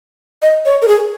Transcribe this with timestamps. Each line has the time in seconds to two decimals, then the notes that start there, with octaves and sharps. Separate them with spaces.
0.42 D#5
0.65 C#5
0.82 A#4
0.88 G#4